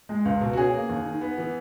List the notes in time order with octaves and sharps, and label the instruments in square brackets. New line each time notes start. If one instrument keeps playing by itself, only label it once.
[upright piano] G#3
C#2
B2
F#4
C#4 G#4
A#3
D#2
D#3
B3
E3